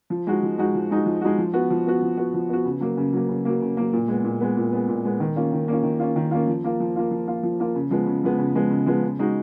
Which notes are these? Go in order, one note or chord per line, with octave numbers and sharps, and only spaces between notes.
F3
G#3 D#4 F#4
F3
G#3 D#4 F#4
F3
G#3 D#4 F#4
F3
G#3 D#4 F#4
F3
B3 F#4
F3
B3 F#4
F3
B3 F#4
F3
B3 F#4
C#3
F#3 A#3
C#3
F#3 A#3
C#3
F#3 A#3
C#3
F#3 A#3
A#2
G#3 B3
A#2
G#3 B3
A#2
G#3 B3
A#2
G#3 B3
D#3
A#3 C#4 F4
D#3
A#3 C#4 F4
D#3
A#3 C#4 F4
D#3
A#3 C#4 F4
F3
A#3 F4
F3
A#3 F4
F3
A#3 F4
F3
A#3 F4
C#3
F3 G#3 B3
C#3
F3 G#3 B3
C#3
F3 G#3 B3
C#3
F3 G#3 B3
C#3
G#3 D#4 F#4